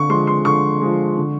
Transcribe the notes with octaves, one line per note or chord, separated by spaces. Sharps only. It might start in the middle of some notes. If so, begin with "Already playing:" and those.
Already playing: D3 C#6
F3 G#3 C6
C6
D3 C#6
F3 G#3
D3